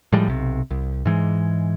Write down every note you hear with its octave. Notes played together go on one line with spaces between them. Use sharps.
A2 F3 G3 G#3
B1 C3
C2
G#2 E3 G#3